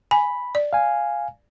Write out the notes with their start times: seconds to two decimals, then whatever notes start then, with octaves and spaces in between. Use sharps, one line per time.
0.11 G#5 B5
0.55 D5
0.73 F5 G#5